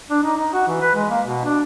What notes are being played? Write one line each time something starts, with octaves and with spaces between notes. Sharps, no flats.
D4
D#4
D#4
F#4
E3
B4
G#3
A#3
B2
D4